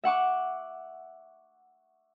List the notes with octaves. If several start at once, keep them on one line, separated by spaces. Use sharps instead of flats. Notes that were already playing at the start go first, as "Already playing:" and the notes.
E5 F#5 C#6 D6